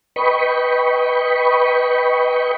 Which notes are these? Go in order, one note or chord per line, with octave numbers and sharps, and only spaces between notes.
B4 D#5 G5 B5 C#6